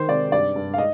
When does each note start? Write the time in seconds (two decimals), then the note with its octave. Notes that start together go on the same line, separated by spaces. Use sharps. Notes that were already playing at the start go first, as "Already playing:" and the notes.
Already playing: D#3 C5
0.08 C3 D5
0.32 G2 D5
0.56 G2
0.74 F5
0.78 D#5